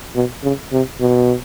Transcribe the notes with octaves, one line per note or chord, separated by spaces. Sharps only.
B2
C#3
C3
B2